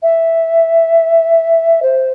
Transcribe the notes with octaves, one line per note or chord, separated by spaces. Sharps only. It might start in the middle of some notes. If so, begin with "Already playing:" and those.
E5
C5